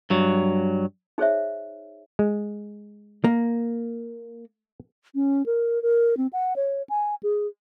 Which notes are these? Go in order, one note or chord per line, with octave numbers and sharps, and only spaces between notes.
G2 F#3
D#4 G#4 C5 C#5 E5
G#3
A#3
C#4
A#4
A#4
C4
F#5
C#5
G#5
G#4